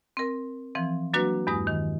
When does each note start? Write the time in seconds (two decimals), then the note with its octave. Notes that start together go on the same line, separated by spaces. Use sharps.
0.17 C4 A#4
0.75 E3 F3 C4
1.14 F#3 A#3 D4 F#4 B4
1.47 E2 G2 G#3 D#6
1.67 D#3